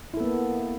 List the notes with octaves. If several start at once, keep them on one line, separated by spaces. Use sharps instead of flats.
A#3 B3 E4 A4